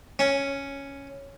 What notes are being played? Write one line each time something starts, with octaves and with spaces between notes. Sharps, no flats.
C#4